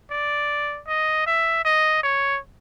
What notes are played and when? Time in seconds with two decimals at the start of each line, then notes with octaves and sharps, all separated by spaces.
0.11 D5
0.88 D#5
1.27 E5
1.65 D#5
2.04 C#5